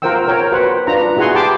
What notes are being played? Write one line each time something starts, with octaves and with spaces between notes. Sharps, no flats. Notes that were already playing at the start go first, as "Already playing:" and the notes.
F4 A#4 C5 F#5 G5 E6
A#4 C#5 G5
F#4 B4 C5 F#5
D4 F4 B4 A#5
E4 F#4 G#4 F#5 G#5 C6
G4 G5 A5 B5 C6 D6